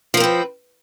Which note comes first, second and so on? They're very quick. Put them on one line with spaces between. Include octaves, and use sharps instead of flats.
F3 A#4 C4 B4